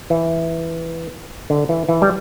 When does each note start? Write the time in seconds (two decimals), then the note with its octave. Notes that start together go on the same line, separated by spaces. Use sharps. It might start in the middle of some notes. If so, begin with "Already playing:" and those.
0.10 E3
1.50 D3
1.69 E3
1.89 E3
2.02 G3